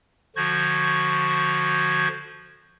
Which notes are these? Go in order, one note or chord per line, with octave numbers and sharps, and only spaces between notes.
D3 F3 F#4 C#6 G6 G#6